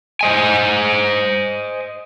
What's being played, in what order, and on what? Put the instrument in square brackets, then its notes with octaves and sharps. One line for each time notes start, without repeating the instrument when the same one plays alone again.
[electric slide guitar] C5 D#5 G#5